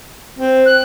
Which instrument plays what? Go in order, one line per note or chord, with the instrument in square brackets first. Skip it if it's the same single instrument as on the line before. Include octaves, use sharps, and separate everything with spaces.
[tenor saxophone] C4
[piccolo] F#6